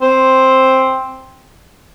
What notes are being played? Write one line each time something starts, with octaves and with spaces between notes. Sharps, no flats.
C4